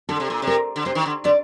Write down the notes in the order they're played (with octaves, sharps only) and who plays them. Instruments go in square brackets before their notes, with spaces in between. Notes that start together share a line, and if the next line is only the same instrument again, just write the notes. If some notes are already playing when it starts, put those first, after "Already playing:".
[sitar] D3 [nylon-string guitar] A4
[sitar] C3
A#2
C3
[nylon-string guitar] A#4
[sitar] D3
[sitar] C3 [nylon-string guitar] C5
[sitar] D#3
D3
[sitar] D3 [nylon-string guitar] D5